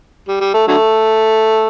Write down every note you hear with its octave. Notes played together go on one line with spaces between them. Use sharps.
G3
G3
A3
D3 F#3 A3